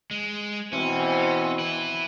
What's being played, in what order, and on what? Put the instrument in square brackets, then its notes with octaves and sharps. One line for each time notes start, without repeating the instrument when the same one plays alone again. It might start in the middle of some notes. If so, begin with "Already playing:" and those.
[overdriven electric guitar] G#3
[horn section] B2 E3 C4 [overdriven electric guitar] C#4
[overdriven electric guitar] E4 B4